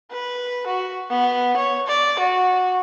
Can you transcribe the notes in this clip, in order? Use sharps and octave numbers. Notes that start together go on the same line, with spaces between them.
B4
F#4
B3
C#5
D5
F#4